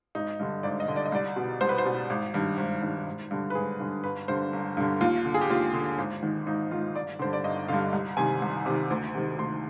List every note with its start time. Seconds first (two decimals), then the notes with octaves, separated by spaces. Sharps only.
0.15 G#1 D#4
0.39 G2 D3
0.63 G#1 D5
0.80 D#5
0.88 G2 D3
0.96 D5
1.06 D#5
1.12 C2 D5
1.36 B2
1.61 C2 C5
1.69 B4
1.78 C5
1.85 B2
2.10 G#1
2.34 G2 D#3
2.58 G#1
2.82 G2 D#3
3.07 G#1
3.31 G2 D3
3.50 B4
3.55 G#1 G#4
3.79 G2 D3
4.03 G1 B4
4.28 G2 D3 C5
4.53 G1
4.77 G2 D3
5.01 D#2 F4
5.25 D3
5.34 G#4
5.41 G4
5.50 D#2 F4
5.74 D3
5.98 G#1
6.22 G#2 D#3
6.47 G#1 D#4
6.71 G#2 D#3 F4
6.96 G1 D5
7.19 G2 D3 C5
7.33 D5
7.44 G1 D#5
7.68 G2 D3 F5
7.92 C2
8.17 C3 D#3 G#5
8.42 C2
8.66 C3 D#3
8.90 D2
9.14 C3 D#3
9.38 D2 C6